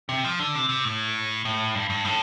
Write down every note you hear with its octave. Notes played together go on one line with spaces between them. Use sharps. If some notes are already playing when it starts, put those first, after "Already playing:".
C3
F3
D3
C3
C3
A2
A2
G2
G2
A2